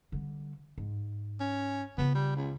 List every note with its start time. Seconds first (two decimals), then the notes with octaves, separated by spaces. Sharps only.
0.12 D3 G3
0.78 G#2
1.40 C#4
1.98 C#3 B3 F4
2.15 G3
2.36 C#2